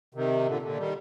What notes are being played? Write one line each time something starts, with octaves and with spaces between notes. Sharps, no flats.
C3 D#3
A#2 D3
A#2 D3
D#3 G3